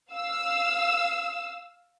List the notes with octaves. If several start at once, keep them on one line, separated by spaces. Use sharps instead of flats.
F5 E6